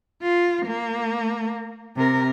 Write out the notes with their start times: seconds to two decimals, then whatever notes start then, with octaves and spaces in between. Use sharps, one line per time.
0.22 F4
0.66 A#3
1.96 C3 A#4